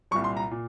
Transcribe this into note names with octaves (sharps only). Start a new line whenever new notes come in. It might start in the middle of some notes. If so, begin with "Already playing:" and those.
C2 A#2 G3 C#6
C6
A#5
A#2